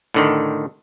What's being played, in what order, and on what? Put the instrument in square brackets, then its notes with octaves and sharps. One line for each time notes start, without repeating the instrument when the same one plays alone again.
[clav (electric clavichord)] A2 D3 D#3